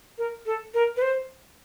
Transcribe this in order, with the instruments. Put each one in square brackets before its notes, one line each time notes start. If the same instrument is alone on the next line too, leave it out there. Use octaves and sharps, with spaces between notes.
[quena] A#4
A4
A#4
B4
C5